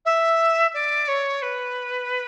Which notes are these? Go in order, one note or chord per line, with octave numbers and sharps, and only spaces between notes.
E5
D5
C#5
B4